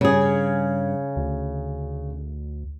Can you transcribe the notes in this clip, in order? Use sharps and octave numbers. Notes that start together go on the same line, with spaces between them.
G2 C#3 G#4
D2